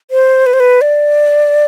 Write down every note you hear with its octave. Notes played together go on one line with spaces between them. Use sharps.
C5
B4
C5
B4
D5